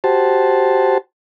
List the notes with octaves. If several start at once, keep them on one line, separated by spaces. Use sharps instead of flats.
F#4 G4 C5 A5